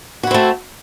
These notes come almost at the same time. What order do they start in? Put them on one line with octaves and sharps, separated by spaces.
F#4 E4 C4 A3